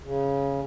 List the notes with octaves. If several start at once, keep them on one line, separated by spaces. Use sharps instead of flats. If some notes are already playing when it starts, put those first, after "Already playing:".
C#3